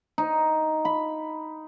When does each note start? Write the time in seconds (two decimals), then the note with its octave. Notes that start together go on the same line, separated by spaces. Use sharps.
0.18 D#4
0.85 B5